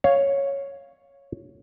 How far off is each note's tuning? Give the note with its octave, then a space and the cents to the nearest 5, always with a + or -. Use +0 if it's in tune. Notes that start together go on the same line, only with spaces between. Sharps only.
C#5 +0 F5 +0